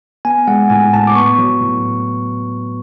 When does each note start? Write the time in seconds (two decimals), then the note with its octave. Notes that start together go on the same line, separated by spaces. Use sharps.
0.25 B3 G#5
0.47 G#3 F#5
0.70 A2 G#5
0.93 A2 A5
1.07 D6
1.15 B3 C#6
1.38 F#3
1.61 A2